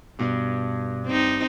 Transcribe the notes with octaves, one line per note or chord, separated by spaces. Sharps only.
G2 B2
C4 D#4